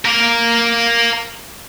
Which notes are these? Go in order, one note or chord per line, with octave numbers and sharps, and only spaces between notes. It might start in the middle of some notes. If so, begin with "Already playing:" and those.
A#4 F5